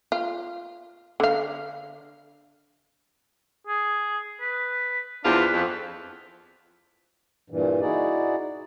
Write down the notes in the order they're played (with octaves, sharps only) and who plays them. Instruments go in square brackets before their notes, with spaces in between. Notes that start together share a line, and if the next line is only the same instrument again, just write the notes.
[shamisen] F4
D3 F5
[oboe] G#4
B4
[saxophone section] E2 F3 F4 [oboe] D4
[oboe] B4
[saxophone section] F2
[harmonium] G2 A#2 E3
D#4 E4 F#4 G#4 D5